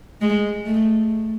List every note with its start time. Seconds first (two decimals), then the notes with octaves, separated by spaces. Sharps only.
0.21 G#3
0.66 A3